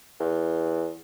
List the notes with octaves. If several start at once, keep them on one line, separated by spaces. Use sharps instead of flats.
E2